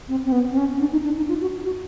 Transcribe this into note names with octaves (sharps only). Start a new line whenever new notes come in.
C4
C4
B3
C4
C#4
D4
D#4
D4
D#4
F4
F#4
F#4